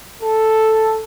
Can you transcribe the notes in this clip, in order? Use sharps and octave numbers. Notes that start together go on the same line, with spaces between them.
A4